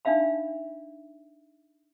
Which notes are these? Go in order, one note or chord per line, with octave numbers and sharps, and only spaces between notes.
D4 D#4 E5 F5 B5